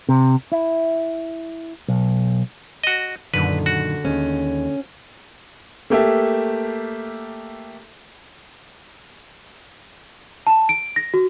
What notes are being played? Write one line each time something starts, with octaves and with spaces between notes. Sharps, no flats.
C3
E4
B1
F#4 D#5
F#2 A#2 D3 D#3 B4
F#4
D#2 G#3 C#4
A3 A#3 G4 A4 E5
A5
D7
A#6
F#4